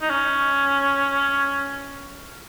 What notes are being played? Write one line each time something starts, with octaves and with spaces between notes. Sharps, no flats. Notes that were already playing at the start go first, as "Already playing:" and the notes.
D#4
C#4